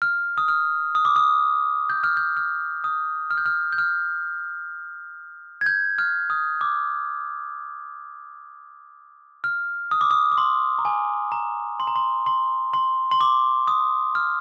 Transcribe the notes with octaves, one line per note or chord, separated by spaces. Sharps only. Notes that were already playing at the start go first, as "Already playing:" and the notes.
F6
D#6
F6
D#6
D6
D#6
G6
F6
G6
F6
D#6
F6
G6
F6
G6
F6
G#6
G6
F6
D#6
D6
F6
D#6
D6
D#6
D6
C6
A#5
G#5
A#5
C6
A#5
C6
C6
C6
C6
D6
D#6
F6